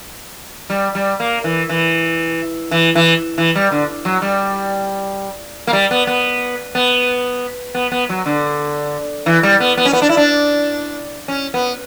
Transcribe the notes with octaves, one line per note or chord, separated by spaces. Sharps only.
G3
G3
A#3
E3
E3
E3
E3
E3
G3
D3
F#3
G3
A#3
G3
B3
B3
B3
B3
B3
F#3
D3
E3
G3
B3
B3
C#4
B3
D4
E4
D4
C#4
B3